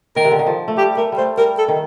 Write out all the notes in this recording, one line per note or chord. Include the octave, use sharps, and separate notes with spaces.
D#3 A#4
C3
D3
D#3
F3
A3
G3 G4
A3 A#4
G3
A3 C5
G3 A#4
A4
D#3